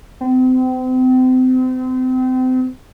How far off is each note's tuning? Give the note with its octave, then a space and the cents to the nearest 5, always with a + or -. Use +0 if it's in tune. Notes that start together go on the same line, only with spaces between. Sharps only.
C4 -35